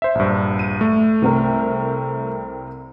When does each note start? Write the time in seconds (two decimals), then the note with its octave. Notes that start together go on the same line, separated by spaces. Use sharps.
0.02 C5 E5
0.15 A#1 G2
0.59 D#7
0.81 A3
1.22 C2 C4 A#4